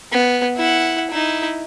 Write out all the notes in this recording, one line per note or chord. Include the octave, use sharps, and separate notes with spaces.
B3
E4 F#5
D#4 E4